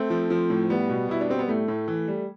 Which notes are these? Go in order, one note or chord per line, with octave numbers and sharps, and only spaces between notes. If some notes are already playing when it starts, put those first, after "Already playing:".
Already playing: A3 C4
F3
F3
A2
G3 B3
B2
B2 E4
D4
G3 C4
B3
A2 A3
A2
E3
G3